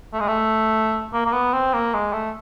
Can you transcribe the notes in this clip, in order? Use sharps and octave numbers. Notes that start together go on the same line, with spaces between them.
A3
G#3
A3
A#3
A#3
B3
C4
A#3
G#3
A3